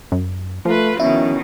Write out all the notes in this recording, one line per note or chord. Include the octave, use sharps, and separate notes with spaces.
F#2
F3 A3 F4 B4
B2 D#3 C#4 E4